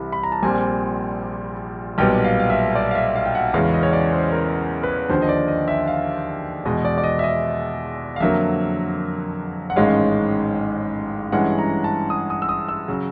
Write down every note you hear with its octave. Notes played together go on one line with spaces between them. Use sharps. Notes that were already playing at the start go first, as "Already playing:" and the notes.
Already playing: C2 C3 E3 B5
B5
A#5
A5
A#1 A#2 G3 C4 G#5
B1 A#2 G3 B3 G5
F5
F5
E5
D5
F5
E5
F5
G5
F#5
E2 C#3 E3 G#3 C#4 F5
D#5
C#5
D5
C5
A#4
B4
D#2 D3 F3 C5
D#5
D5
D#5
E5
F5
E2 B2 G#3 D#5
D5
D5
D#5
E5
D#5
F5
F2 D3 F#3 A#3 E5
F#5
A1 G#2 D#3 G#3 C#4 F5
G2 E3 G#3 C#4 F#5
A#5
A5
D#6
D#6
E6
D#6
E6
C#3 F#3